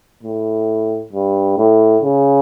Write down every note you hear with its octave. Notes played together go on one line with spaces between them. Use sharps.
A2
G2
A2
C#3